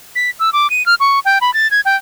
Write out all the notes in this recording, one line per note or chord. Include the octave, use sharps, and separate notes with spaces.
B6
E6
D6
D#7
F6
C#6
G5
B5
A6
G#6
G5